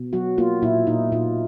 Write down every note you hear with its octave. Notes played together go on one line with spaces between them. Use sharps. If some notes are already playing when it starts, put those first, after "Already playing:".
Already playing: B2
F#3 F#4
A#3 F4
A#2 E4
A#2 D#4
A#2 F4